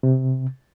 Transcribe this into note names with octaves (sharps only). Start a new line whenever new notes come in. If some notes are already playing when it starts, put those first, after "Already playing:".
C3